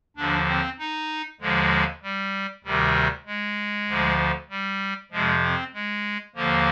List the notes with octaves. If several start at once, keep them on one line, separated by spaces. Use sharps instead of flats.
D#2 D3 F3 D4
C4
D#4
D#2 D3 F3 G#3
G3
D2 C3 D#3 G3
G#3
D2 D3 F3
G3
F2 C3 F3 G#3
C4
G#3
D#2 D3 F3 A#3